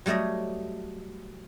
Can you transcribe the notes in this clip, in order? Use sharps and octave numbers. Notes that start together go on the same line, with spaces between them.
F#3 G3 A3 C#5 D#5